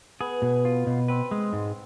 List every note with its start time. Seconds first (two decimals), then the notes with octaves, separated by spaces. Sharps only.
0.20 B3 G#4
0.42 B2
0.65 F4
0.87 B2
1.08 C4 B4
1.31 G#3
1.53 G#2